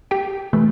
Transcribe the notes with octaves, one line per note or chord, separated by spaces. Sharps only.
G4 G5
C3 E3 A3